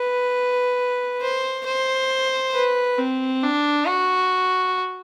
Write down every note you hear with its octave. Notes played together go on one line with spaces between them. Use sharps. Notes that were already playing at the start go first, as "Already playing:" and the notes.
Already playing: B4
C5
C5
B4
C4
D4
F#4